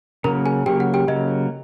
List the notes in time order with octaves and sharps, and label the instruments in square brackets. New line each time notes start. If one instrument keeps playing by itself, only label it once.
[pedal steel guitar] C#3 F#3 A#3 [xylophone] A#4 A#5
[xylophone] G#4 G#5
[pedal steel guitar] C#3 F#3 A#3 [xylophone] G4 G5
[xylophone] F#5
G4 G5
[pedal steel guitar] C#3 F#3 A#3 [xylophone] D#5